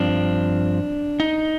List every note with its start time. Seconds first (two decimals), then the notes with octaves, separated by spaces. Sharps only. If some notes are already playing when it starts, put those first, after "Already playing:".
Already playing: G2 F3 C4 D4
1.20 D#4